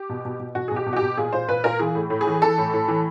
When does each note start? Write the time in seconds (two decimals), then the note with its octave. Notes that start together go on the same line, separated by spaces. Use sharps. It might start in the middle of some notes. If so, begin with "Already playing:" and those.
Already playing: G4
0.09 B2
0.25 B2
0.40 B2
0.55 B2 F#4
0.68 G#4
0.71 B2 G4
0.86 B2
0.93 F#4
0.96 B2 G4
1.17 A#2 G#4
1.33 A#2 C5
1.48 A#2 B4
1.64 A#2 A#4
1.79 E3 G#4
1.95 A2
2.10 A2
2.21 G#4
2.27 E3
2.42 E3 A4
2.58 A2
2.74 A2
2.88 E3